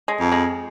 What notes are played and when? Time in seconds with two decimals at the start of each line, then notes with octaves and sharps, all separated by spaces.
0.08 G#3
0.20 F2
0.32 G#3